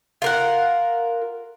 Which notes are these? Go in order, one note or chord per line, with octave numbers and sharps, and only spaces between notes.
F4 A#4 F#5